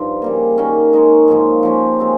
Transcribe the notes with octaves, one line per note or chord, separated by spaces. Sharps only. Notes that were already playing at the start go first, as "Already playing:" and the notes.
Already playing: G2 F3 D#4
C#3 G3 A#3
D#3 A#3 C#4
G#3 D#4 A#4 C#5
G#2 F3 A#3 D#4
F3 A#3 C#4 G4
G#3 C4 F4